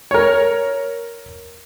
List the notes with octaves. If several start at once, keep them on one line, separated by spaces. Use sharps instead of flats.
A#4 C#5